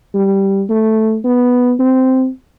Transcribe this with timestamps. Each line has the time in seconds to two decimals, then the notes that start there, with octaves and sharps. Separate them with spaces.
0.14 G3
0.69 A3
1.24 B3
1.79 C4